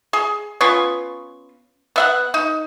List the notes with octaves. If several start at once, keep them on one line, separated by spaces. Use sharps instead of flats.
G#4
B3 C#4 F4 C#6
B3 E5 F#5
D#4